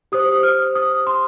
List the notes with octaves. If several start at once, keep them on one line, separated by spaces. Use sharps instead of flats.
G4 C5 D#6
F6
D#6
C6